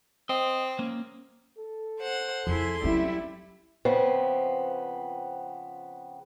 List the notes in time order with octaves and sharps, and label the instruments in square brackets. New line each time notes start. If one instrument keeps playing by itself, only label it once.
[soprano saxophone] C4 [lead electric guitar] D#5
[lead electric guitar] A#3 C#4
[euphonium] A4
[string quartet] C5 F#5
[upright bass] F2 [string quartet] E4 G#4 C6
[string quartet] F#3 G3 [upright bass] C4 C#4 [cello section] E4
[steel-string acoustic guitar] C#3 F3 B3 C4